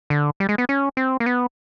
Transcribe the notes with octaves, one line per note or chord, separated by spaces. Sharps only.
D3
G3
G#3
B3
C#4
C4
A#3
B3